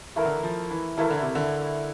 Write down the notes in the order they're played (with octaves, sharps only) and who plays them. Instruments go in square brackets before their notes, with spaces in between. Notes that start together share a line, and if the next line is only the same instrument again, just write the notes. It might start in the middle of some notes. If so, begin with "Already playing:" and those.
[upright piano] E3 [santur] A3 E4 A#4 E5
[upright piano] D3
E3
F3
E3
[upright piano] E3 [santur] A3 E4 A#4 E5
[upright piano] D3
C3
D3